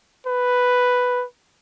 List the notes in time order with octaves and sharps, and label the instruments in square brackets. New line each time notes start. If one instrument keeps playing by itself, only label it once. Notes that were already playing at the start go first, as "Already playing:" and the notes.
[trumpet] B4